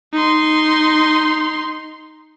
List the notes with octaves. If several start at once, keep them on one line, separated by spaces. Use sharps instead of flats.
D#4 C6